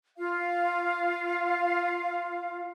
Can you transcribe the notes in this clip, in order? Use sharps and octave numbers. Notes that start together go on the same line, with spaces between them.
F4 F5